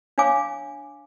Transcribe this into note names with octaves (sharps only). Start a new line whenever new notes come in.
D4 C#5 F5 G#5 D6